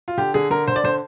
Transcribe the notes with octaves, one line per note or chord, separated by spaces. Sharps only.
F4
D3 G4
D3 G#4
D3 A#4
D3 C5
D5
D3 C5